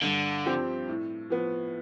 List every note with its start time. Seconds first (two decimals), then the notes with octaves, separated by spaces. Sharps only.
0.03 G2 D3
0.45 F3 C4 G4
0.88 A2
1.30 F3 B3